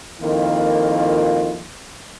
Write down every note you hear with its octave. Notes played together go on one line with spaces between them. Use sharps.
F2 D#3 A#3 E4 F4